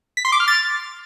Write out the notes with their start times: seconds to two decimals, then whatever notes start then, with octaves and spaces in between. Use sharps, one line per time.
0.17 B6
0.25 C6
0.32 D6
0.40 F6
0.48 A6